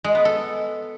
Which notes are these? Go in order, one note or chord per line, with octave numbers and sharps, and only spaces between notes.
G#3
B3
A4